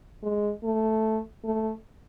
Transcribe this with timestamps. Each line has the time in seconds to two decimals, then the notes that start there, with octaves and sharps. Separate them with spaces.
0.23 G#3
0.64 A3
1.45 A3